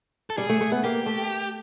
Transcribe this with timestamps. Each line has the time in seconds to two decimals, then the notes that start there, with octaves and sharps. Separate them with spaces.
0.30 A4
0.37 G3 G#4
0.49 A3
0.61 A3
0.72 B3
0.84 A#3 G4
1.06 A3